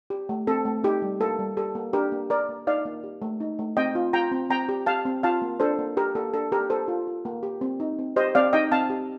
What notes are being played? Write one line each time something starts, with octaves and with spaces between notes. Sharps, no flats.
G4
A3
C4 A4
A3
D#4 G4
G3
A#3 A4
G3
G4 A4
A#3
D4 G4 A#4
A#3
G4 A#4 D5
A#3
D#4 D5 F5
A#3
G4
A3
D#4
A3
C4 D#5 G5
F4
F4 G5 A#5
C4
C4 G5 A#5
G4
G4 F5 A5
C4
F4 F5 A5
A#3
D4 A4 C5
A#3
G4 A#4
A#3 A4
D4 A4
A#3 G4 A#4
A#3 A4 C5
F4
F4
A#3
G4
C4
D#4
C4
G4 C5 D#5
C4 D5 F5
D#4 D#5 G5
C4 F5 A5
G4